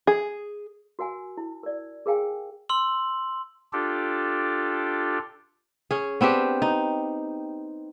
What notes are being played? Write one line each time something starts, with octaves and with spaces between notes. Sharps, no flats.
G#4
F#4 A#4 F#5 G#5
E4
A#4 D5
G#4 A#4 F5 G5 G#5
C6 E6 F#7
D4 F4 G4 A4
C#4 G#4
B3 C4 D4 G4
D#4